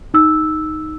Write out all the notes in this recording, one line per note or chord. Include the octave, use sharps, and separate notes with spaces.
D#4 E6